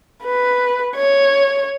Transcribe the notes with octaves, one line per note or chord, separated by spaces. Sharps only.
B4
C#5